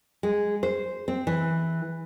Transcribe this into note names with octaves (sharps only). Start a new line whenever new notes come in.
G#3
C5
C4
E3